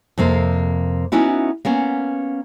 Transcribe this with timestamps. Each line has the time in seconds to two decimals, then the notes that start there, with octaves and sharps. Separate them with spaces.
0.18 F2 C3 A#3 C5
1.12 B3 C#4 D#4 E4 F#4
1.65 A#3 B3 C#4